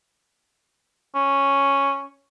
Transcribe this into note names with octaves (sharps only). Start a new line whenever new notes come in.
C#4